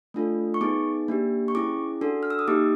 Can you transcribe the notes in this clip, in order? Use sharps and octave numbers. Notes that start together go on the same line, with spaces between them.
A3 D4 F4 A4
C#6
B3 D#4 G#4 D6
A#3 D4 G4
C#6
C#4 E4 G#4 D6
D4 F#4 A4
F6
E6
D#6
A#3 D#4 G4 D6